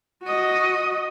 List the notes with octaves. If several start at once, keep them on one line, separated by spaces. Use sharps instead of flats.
F#4 D#5